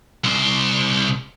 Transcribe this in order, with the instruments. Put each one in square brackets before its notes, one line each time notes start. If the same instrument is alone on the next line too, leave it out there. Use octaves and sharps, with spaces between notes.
[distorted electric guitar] C2 C5